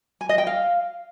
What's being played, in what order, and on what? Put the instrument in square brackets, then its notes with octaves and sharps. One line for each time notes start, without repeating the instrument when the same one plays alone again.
[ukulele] G#5
D#5
G5
F5